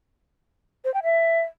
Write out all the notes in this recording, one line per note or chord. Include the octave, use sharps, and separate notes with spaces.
C5
G5
E5